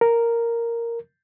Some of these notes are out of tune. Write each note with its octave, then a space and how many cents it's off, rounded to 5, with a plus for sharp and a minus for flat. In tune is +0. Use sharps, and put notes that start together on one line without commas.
A#4 -5